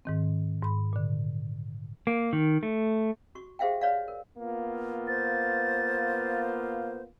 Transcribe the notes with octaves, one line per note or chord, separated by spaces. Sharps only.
G#2 D#3 C4
G#2 B5
A#2 D3
A#3
D#3
A3
F#4 C#6
G4 G#4 C5 E5 F5 G5
B4 C#5 D5 E5 F5
A#4
A#3 B3 F4
C5 A6